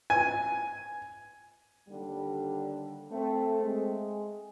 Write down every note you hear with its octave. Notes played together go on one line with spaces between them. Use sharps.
G#5
D#2 D3 G3
A3 C4
G#3 G#4